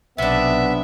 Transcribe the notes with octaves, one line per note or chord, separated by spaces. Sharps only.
B1 C3 B3 D4 E5